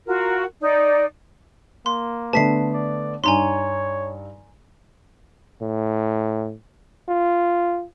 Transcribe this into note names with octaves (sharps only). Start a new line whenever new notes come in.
F4 F#4 A#4
D#4 D5
A#3 C6
D3 A3 B3 A5 B6 C7
D5
G2 D#4 C#5 G#5 A#5 C6
A2
F4